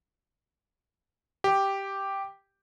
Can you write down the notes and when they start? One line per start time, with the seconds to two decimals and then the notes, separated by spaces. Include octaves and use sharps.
1.44 G4